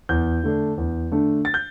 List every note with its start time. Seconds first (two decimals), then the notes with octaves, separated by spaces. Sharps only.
0.09 E2 G6
0.44 D3 A3 D4
0.78 E2
1.12 D3 A3 D4
1.45 A6
1.54 G6